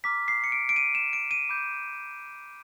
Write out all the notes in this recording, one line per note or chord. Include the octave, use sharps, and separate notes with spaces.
A#5 D6 F6 B6
C7
C#7
D7
D7
D#7
E7
D7
D#7
B5 D6 G6